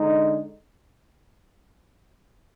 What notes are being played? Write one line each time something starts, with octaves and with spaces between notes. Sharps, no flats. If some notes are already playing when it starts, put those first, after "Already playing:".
Already playing: D3 G#3 D#4